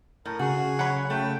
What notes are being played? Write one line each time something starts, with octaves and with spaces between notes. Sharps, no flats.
A2 A#4
C#3 F#4 G#4
F#3 C#5 F#5 B5
A3 G5